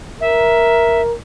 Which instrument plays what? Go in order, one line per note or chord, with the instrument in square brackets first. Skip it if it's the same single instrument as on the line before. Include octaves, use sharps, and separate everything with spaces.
[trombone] A#4 [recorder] E5